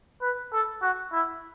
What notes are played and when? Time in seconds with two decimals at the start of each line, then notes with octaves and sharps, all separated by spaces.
0.22 B4
0.52 A4
0.82 F#4
1.12 E4